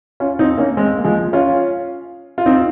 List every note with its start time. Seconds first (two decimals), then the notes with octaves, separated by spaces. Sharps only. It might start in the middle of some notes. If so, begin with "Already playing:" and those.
0.20 C#4 F4
0.39 C4 D#4
0.58 A#3 C#4
0.77 G#3 C4
0.98 A#3
1.04 F3 G#3
1.33 C#4 F4
2.38 F4
2.46 C4 D#4